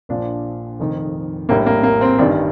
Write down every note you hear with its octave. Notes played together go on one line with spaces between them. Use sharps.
A#1 A#2 F3 D4
F1 F2 D#3
A#1 A2 G3 A#3
A#3
A#3
C4
A1 G2 D#3 G3 D4